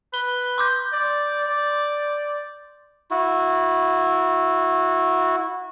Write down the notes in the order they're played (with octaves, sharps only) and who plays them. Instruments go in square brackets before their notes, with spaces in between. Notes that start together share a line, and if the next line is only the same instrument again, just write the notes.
[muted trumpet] B4 [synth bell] G7
[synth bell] C6 D6 G6
[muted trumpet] D5
D5
[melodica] E4 F#4